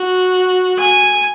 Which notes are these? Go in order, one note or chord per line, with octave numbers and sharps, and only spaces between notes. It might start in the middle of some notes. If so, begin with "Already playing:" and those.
Already playing: F#4
G#5